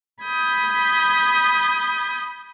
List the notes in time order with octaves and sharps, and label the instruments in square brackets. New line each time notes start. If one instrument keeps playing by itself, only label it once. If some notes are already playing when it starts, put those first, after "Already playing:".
[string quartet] B5 D#6 G6 G#6